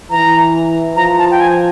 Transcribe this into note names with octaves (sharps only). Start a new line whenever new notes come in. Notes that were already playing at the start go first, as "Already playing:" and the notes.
E3 A#5
F3 A#5
A5
G5
G#5